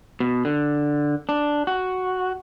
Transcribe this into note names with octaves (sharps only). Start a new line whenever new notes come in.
B2
D3
D4
F#4